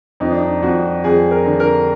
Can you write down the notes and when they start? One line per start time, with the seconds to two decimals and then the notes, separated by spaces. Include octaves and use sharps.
0.20 F2 D#4
0.31 D4
0.41 D#4
0.62 F2 F#4
1.04 F2 G#4
1.31 A#4
1.46 D3
1.60 A#4